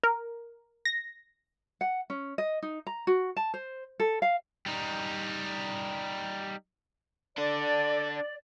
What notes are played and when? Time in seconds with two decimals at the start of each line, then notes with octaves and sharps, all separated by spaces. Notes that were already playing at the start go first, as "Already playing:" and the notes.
0.03 A#4
0.85 A#6
1.81 F#5
2.10 C#4
2.38 D#5
2.63 D#4
2.87 A#5
3.07 F#4
3.37 A5
3.54 C5
4.00 A4
4.22 F5
4.66 G3 D#4
7.38 D4 A4 D5